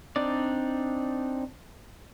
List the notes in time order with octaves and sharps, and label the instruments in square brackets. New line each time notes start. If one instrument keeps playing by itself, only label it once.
[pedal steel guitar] C4 D4 D#4 D5